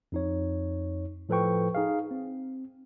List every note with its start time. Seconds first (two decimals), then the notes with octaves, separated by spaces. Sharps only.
0.12 F2 D#4 C#5
1.29 A2 F3 A4 B4 G5 C#6
1.75 D#4 G#4 F5
2.11 C4